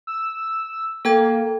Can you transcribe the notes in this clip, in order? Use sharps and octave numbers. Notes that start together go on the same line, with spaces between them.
E6
A#3 A4 G5 G#6